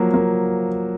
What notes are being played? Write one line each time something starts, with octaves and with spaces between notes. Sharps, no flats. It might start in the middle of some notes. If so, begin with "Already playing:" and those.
Already playing: F3 F#3 A#3
A#3